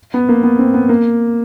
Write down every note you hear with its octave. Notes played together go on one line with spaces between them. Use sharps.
B3
A#3
B3
C4
B3
A#3